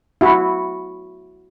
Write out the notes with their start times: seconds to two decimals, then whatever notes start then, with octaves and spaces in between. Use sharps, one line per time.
0.21 E4 F#4